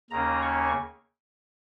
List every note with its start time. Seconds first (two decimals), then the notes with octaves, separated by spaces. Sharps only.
0.10 D#2 C#3 A#3 C#4 A#5
0.42 C#6